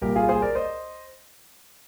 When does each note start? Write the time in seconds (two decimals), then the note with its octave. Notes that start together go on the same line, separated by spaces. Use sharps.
0.01 C2 A#2 G4 A#4
0.16 F4 G#4
0.29 G#4 C5
0.42 A#4 D5
0.55 C5 D#5